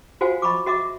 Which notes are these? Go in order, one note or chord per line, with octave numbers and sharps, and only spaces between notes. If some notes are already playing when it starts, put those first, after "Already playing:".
F4 F#4 C5 F5 G#5
D#5 B5 C#6 D6
F#4 D#5 E5 D6